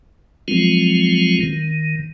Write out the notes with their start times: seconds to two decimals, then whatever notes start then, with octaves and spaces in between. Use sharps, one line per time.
0.48 F3 F#3 G#3 C4 C#4 F4
1.40 D#3